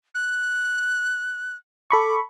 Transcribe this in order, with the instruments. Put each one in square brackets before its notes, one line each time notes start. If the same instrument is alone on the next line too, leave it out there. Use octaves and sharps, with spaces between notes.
[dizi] F#6
[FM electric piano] A4 B5 C#6 [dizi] D6